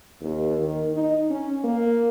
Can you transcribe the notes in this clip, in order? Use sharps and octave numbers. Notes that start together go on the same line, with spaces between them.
D#2
D#3
D#4
C#4
A#3